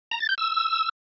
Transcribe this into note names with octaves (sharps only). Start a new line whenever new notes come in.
A#5
A6
G6
E6